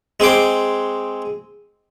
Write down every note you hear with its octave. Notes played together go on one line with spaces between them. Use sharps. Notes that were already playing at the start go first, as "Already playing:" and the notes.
G#3 C4 C6 D6